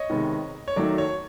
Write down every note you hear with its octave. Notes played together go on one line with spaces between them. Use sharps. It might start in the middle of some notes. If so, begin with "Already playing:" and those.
Already playing: C#5 D#5
C3 D#3 G#3 B3
C#5
D#3 F#3 A3 D5
C#5